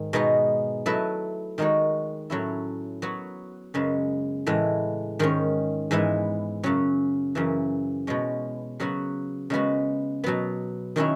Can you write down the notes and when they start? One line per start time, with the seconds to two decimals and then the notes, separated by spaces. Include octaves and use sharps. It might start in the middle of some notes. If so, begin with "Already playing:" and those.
Already playing: G#2 D#3
0.13 B2 G#3 B3 D#4 G#4
0.86 F#3 A3 E4 B4 D#5
1.58 D#3 G#3 D#4 F#4 C#5
2.30 A2 F#3 C#4 E4
3.02 F#3 B3 F#4 C#5
3.74 F#2 C#3 G#3 B3
4.46 A2 E3 G#3
5.19 G#2 D#3 G#3 C#4
5.91 G#2 E3 G#3 B3 E4
6.63 F#2 C#3 F#3 C#4
7.35 F#2 C#3 E3
8.07 B2 G#3 C#4
8.80 C#3 F#3 B3 F#4
9.50 C#3 G#3 B3 F#4 B4
10.24 B2 F#3 B3
10.96 D#3 F#3 C#4 E4